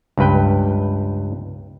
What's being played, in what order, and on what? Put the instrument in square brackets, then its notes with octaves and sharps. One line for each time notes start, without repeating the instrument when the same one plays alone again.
[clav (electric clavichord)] C#2 G2 B4 G5